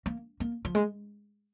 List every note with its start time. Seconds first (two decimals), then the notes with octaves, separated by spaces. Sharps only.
0.06 A#3
0.40 A#3
0.65 F3
0.75 G#3